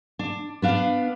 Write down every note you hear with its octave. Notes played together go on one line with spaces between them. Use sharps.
D4
B3 D4 F5